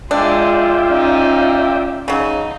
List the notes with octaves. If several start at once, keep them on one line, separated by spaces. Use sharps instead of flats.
G#3 D4 F4 D5 E5 G5
C#4 D#4
C#3 F#3 D#4